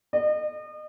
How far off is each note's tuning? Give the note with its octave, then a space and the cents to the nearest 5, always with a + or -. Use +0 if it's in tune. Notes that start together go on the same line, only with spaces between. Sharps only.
D#5 -35